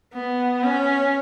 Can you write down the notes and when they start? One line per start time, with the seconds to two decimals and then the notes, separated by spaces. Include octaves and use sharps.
0.13 B3
0.63 C#4